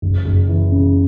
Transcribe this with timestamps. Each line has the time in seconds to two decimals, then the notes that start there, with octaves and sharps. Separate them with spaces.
0.02 F#1
0.25 F#1
0.49 E3
0.72 C#3